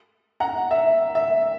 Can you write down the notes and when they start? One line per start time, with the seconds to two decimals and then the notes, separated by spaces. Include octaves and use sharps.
0.40 F#5 A#5
0.71 E5
1.15 E5